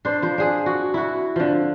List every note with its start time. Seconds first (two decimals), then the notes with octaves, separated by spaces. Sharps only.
0.05 D4 C5
0.22 F3 C5
0.38 D4 G#4
0.66 F#4
0.94 E4 F#4
1.36 D3 F3